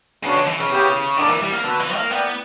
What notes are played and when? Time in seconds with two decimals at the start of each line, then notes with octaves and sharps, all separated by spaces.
0.23 C#3 B3 D4 F#4 C#5
0.36 D3
0.47 E3
0.59 C#3
0.70 B3 E4 G4 C#5 G5
1.17 D3 A#3 E4 A#4 D5
1.28 E3
1.41 G3
1.52 A#3
1.64 D3 B3 F#4 B4
1.79 E3
1.96 A#3
2.10 B3 E4 A#4 D5 G5